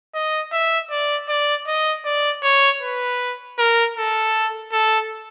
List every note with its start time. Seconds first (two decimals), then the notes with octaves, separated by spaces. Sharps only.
0.14 D#5
0.52 E5
0.91 D5
1.29 D5
1.67 D#5
2.05 D5
2.43 C#5
2.82 B4
3.58 A#4
3.96 A4
4.72 A4